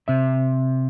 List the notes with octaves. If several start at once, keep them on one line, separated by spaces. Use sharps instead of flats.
C3 E5